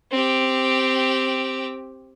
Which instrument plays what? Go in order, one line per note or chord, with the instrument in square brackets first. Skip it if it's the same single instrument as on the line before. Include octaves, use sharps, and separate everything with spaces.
[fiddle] C4 G4